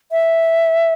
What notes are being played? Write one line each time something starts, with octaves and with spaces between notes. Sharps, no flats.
E5